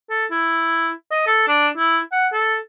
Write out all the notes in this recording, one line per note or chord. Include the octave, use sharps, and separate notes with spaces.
A4
E4
D#5
A4
D4
E4
F#5
A4